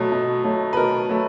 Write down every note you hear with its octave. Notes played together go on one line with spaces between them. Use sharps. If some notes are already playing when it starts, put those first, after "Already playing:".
Already playing: B2 F#3 A3
B2
F#3 A3
B4
B2 A#4
F#3 A3